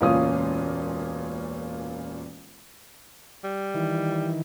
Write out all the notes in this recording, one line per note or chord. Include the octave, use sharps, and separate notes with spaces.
E1 C#2 A#2 C#4 F4 D#6
G3
D#3 E3